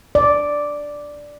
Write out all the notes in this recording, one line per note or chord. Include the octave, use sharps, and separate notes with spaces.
D5